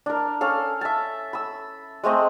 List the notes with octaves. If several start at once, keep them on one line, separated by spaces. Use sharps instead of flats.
D4 A#4
C#4 A4 F5
E5 A5
B5 E6
G#3 A3 C4 D#5